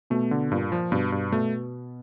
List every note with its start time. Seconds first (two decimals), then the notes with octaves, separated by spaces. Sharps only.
0.10 B2 A3 B3
0.31 D3
0.51 G2 A#2 A#3
0.72 F3
0.91 G2 B2 B3
1.12 G2
1.32 B2 A3 B3